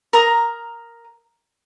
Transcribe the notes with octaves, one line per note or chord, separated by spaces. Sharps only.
A#4 A#5 D#6